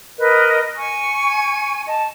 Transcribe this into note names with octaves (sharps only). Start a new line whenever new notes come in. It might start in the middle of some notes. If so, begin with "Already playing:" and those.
A#4 B4 D#5
G#5 C#6
D#5 A5